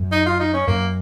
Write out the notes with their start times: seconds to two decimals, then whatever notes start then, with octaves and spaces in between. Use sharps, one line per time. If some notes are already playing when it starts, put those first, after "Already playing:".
Already playing: F#2
0.12 D#4
0.26 F4
0.40 D#4
0.53 C#4
0.67 F#2 A#3